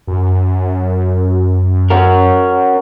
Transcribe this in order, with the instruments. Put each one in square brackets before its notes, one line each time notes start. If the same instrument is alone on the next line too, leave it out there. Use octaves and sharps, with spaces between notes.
[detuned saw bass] F#2
[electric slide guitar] C#4 F#4 A#4